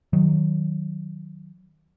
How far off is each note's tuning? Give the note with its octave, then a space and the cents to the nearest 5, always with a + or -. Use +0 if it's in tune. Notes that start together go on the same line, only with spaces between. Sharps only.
D#3 +0 F#3 +0